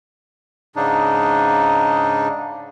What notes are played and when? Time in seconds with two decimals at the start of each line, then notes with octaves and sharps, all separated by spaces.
0.76 G#2 C#3 D4 D#4